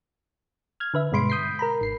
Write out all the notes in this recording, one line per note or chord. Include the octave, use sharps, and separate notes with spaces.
F6 G#6
D3 B4 E5
G2 B2 G#3 B5 C6 D7
D#6 G6 B6 C7
A#4 A#5 B5
G#1 C7